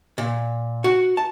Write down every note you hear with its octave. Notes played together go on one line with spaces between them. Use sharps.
A#2
F#4
A5